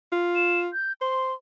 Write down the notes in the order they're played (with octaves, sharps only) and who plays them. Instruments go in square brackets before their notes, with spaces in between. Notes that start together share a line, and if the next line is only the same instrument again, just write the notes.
[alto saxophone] F4
[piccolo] E7
G6
[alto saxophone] C5 [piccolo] C6